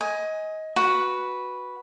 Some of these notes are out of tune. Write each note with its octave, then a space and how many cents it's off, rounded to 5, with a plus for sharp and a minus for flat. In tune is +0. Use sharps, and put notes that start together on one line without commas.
D#5 +20 G#5 +0
F#4 +0 B4 -5